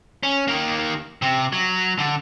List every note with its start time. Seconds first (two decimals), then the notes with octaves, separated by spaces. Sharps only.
0.23 C#4
0.48 D#3 A#3
1.22 C3
1.52 F#3
1.99 D3